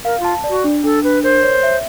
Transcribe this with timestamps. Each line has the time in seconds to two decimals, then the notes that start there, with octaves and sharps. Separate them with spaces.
0.05 A#4 F5
0.20 F4 A5
0.44 D5
0.49 F#4
0.64 D4
0.84 D4 A4
1.03 D4 B4
1.23 A#4 C5
1.43 C#5
1.63 E5